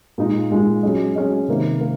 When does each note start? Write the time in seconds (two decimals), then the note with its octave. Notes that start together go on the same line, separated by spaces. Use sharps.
0.18 A#2 G#3 D#4
0.51 A#2 G#3 D#4
0.83 F#3 C#4 G#4 D#5
1.16 F#3 C#4 G#4 D#5
1.48 C3 D#3 A#3
1.81 A#3